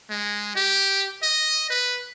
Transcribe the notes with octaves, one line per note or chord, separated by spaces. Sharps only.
G#3
G4
D#5
B4